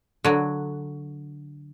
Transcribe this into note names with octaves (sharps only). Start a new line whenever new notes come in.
D3 F#3